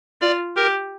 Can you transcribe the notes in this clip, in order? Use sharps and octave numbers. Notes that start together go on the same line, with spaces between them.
F4 D5
G4 A#4